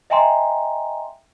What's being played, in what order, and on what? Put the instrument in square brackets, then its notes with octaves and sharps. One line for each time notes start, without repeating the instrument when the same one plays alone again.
[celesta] D#5 E5 G5 G#5 A#5 C6